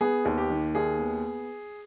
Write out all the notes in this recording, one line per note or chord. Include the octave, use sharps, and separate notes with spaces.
B3 G#4
D#2
G4
D#3
D#2 G#4
B3